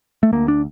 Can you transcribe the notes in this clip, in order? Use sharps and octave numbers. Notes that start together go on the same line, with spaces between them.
A3
D2 A#3
D4